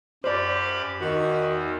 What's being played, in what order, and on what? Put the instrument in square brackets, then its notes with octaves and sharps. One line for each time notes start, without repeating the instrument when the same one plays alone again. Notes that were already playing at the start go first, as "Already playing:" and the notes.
[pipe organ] F#2 G4 B5 [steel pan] C5 D5
[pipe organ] E2 [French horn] D#3 [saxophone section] F#4